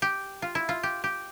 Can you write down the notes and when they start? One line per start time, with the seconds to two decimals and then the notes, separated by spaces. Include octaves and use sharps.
0.02 G4
0.42 F4
0.55 E4
0.69 F4
0.83 G4
1.04 G4